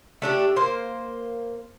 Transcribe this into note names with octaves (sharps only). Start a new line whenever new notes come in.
A3 D4 G4
A#3 C5